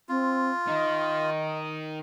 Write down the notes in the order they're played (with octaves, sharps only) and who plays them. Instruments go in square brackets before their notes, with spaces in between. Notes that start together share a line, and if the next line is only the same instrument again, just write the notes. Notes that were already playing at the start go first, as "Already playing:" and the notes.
[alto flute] C4 [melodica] F4
[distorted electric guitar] D#3 [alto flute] D#5